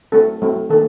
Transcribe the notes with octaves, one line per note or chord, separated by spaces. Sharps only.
F#3 A3 C4 A4
F#3 A3 C4
D#3 F#3 A#3 A4